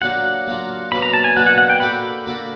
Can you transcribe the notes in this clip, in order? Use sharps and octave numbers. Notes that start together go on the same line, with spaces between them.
F#3 A#3 D4 F4 F#5
F#3 A#3 D4 F4
B2 F#3 A#3 D4 B5
A#5
A5
G#5
B2 F#3 A#3 D4 F#5
F#5
F#5
G5
A#3 D4 F#4 A4 B5
A#3 D4 F#4 A4